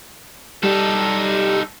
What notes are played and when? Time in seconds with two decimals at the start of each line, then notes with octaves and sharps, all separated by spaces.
0.63 G3 D#4 A4